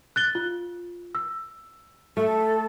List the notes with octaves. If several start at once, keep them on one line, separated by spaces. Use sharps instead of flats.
F#6 A6 G7
F4
E6
A3 A4